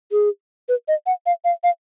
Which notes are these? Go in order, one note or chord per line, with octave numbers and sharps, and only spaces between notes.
G#4
B4
D#5
F#5
F5
F5
F5